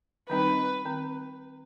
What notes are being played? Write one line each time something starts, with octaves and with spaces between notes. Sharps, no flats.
D#3 G3 C4 D#4 B4
D#3 C4